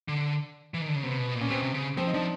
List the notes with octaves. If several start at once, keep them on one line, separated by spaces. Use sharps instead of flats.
D3
E3
D#3
D3
C#3
C3 B3
B2
A#2
C#4
B2 C4
C3
C#3
F3 C4
D#4
F3 D4